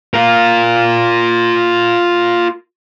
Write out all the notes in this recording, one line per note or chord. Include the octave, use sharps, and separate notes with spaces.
F4 A#4